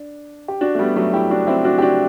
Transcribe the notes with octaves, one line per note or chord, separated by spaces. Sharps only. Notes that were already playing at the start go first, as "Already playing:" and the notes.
Already playing: D4
G4
D4 F#4
A3
G3 B3
F#3 A3
E4 G4
D4 F#4
C4 E4
D4 F#4
G4
D4 F#4